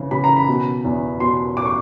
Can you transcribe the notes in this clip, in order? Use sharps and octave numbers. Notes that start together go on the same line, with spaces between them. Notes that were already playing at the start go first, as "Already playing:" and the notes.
Already playing: C#3 E3
C#3 B5
A#5
B5
B2
E2
B2 C6
D6
C#6